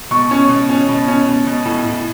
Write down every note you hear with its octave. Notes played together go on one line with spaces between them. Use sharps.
B2 C#6
C#4
B2
C#4
B2
C#4
B2
B2
A2
A2